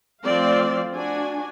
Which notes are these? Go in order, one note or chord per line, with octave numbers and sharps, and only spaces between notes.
F3 A3 C4 D5 F5
D4 F#4 G#5